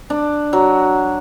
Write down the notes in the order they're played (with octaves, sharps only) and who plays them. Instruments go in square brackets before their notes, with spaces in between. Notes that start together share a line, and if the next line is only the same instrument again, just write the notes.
[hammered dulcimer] D4
F#3